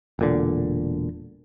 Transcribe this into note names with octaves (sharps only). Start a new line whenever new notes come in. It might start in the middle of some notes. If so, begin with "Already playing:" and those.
E1 A#2 D3